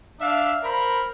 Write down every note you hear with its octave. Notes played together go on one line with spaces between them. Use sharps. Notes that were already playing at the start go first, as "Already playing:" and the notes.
D4 E5 F5
A#4 C5 B5